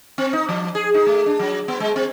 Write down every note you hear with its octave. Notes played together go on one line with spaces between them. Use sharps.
C4
D#4
F3
G#4
D#4
A3
D4
F#3
B3
G#3
C4